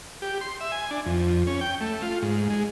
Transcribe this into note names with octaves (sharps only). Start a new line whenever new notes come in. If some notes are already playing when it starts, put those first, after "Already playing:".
G4
C6
E5
G#5
D4
F2
C#4
G5
A3
F4
G#2
G#3